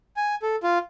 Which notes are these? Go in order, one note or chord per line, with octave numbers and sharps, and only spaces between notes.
G#5
A4
F4